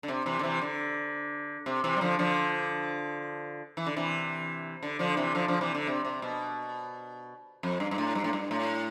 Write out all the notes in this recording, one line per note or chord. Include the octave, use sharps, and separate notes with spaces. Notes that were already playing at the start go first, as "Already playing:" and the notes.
D3
C3
C3 E3
D3
C3 E3
D3
C3
C3 E3
G3
D3 F3
D3 F3
E3
D3
C3 E3
D3
D3 F3
C3 E3
D3 F3
D3 F3
C3 E3
D3
C3
C3
B2
F2
G2
G2
A2
G2
A2
G2
A2